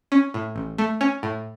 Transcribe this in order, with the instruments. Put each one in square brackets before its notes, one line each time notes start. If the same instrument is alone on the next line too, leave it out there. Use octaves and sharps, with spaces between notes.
[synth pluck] C#4
A2
A1
A3
C#4
A2